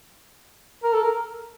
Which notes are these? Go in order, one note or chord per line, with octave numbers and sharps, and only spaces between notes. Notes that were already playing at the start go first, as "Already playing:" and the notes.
A#4
A4
A#4